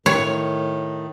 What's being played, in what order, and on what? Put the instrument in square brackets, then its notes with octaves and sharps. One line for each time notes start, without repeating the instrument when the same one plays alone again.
[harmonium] A2 D#3 [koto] C#5